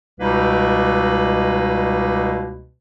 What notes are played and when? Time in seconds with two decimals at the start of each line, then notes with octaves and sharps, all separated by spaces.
0.20 C#2 B2 G3 A#3 D#4 B4